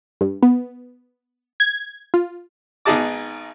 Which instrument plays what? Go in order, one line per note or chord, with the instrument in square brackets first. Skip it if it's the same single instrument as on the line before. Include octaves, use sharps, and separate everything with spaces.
[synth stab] G2
B3
G#6
F4
[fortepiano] G#1 B3 D#4 G#4 A5 D6